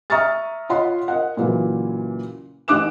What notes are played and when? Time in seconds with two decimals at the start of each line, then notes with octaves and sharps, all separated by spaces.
0.10 E5 A#5 C#6 D#6 F6 A6
0.69 F4 C#5 D#5 F#5 B5 C6
1.08 A#4 D#5 F#5
1.37 A#2 C#3 E3 F#3
2.68 A1 D#4 D6 F#6 E7